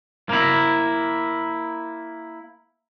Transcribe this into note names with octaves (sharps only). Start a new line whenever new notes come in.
A#3 E4